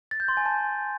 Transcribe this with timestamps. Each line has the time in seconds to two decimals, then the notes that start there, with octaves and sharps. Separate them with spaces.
0.11 A6
0.20 G6
0.28 C6
0.37 G#5
0.46 A5